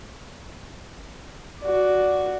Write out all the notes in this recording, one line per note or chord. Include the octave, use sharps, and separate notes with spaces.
F#4 D5